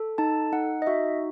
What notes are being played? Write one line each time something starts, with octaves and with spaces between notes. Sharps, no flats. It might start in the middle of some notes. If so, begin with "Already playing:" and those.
Already playing: A4
D#4 A5
D#4 F#5
D#5
F#4 E5